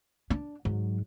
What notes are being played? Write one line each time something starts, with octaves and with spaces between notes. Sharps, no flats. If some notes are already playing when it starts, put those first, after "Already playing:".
D4
G#2 F#3